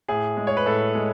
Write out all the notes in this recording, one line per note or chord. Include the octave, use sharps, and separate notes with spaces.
A2 G#4
G#3
C#5
B4
A2 A4
G#3